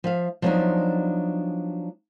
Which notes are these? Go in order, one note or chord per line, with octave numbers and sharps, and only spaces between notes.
F3 E5 F5
F3 F#3 A#3 B3 D4 D#4